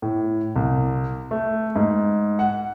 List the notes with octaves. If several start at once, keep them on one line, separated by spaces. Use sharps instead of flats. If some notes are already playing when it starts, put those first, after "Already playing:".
A2
C2
A3
G#2
F#5